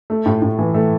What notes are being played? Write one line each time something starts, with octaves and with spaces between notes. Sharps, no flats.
A3
A2
A2
E3
A3